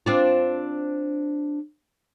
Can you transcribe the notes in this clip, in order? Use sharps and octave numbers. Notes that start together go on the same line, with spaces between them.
C4 D4 F4